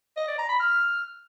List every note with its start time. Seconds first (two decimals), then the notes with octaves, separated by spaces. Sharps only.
0.17 D#5
0.27 D5
0.38 A#5
0.49 B5
0.60 F6